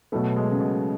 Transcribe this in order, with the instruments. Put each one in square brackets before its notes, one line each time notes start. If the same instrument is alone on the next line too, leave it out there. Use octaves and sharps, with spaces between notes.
[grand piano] B2 F#3 A3 [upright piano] B3
[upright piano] G#3
C#3
B2